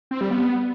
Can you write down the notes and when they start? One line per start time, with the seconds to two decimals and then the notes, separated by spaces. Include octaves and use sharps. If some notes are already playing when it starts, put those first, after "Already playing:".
0.11 C4
0.21 G3
0.31 B3